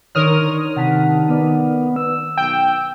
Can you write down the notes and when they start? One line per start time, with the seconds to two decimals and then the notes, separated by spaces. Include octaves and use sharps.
0.15 D#3 D4 A#4 C5 C#5 D#6 F6
0.76 C3 D#3 F#5 A5 B6
1.29 B3 D5 B5 D#7
1.96 E6
2.38 B1 G5